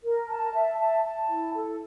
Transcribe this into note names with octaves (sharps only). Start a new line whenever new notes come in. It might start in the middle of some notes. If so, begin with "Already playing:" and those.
A#4
A5
E5
A5
A5
E4
A4